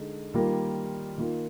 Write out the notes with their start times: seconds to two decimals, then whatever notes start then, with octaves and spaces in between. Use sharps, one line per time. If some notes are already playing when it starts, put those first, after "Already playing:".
Already playing: D3 G#3 D#4
0.34 D#3 G3 A#3 F4 A#4
1.18 D#3 A#3 F4